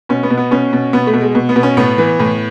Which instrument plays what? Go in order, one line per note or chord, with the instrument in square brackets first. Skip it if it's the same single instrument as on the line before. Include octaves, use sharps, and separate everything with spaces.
[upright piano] B2 C#4
B3
B2
B3
B2 C#4
B2
B2 B3
A3
B2
G#3
B2
B3
B2
C#4
A2 B3
E3
A2